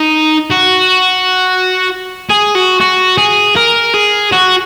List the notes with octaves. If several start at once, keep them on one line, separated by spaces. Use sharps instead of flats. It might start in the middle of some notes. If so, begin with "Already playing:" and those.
Already playing: D#4
F#4
G#4
F#4
F#4
G#4
A#4
G#4
F#4